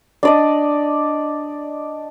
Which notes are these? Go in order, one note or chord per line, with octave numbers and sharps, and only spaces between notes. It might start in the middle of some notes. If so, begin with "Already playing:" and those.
D4 D5 D#5